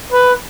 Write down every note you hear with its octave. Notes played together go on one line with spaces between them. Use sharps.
B4